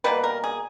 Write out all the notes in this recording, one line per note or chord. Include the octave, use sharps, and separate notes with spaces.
B2 G3 A#3 B4
A#4
G#4